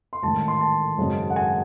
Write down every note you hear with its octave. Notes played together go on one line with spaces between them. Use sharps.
C6
A1 G#2 D#3 A5
C6
A5
G#1 F#2 C#3 G#3
F#5
G#5